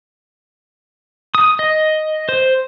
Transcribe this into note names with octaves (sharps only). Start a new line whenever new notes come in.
D#6
D#5
C5